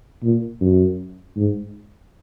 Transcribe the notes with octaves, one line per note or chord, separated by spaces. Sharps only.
A#2
F#2
G#2